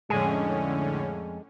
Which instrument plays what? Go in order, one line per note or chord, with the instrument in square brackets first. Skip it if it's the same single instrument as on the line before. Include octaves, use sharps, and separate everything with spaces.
[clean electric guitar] F2 G#4 [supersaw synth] A2 D3 C#4 [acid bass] G#3